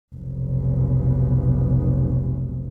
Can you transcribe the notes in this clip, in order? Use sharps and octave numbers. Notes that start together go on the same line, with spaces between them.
F1 B1